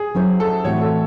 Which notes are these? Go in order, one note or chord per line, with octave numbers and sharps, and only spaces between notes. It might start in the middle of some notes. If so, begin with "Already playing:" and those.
Already playing: G#4
F#3 C#4 E4 C5
A4
A2 E3 C4 F#4 C#5
A4